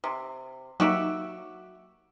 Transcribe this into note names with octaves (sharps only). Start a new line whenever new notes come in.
C3
F#3 A#3 D#4 F#4 G4 E5